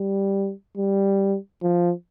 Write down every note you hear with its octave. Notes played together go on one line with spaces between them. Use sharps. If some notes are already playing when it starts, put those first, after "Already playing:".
Already playing: G3
G3
F3